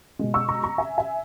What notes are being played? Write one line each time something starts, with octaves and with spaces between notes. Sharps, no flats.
B2 G#3
C#6 E6
A#5 C#6
A#5 C#6
E5 G#5
E5 G#5